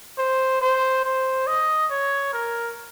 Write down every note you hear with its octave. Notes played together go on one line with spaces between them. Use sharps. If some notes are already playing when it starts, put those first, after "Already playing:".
C5
C5
C5
D#5
C#5
A#4